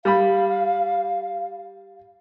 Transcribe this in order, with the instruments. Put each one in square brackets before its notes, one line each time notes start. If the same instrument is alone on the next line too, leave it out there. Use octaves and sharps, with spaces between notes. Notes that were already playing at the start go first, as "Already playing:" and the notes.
[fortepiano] G3 B5 [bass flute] F5